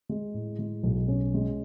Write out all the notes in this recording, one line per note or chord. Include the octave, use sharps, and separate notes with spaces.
G#3
A2
G#3
B1
C#4
G#3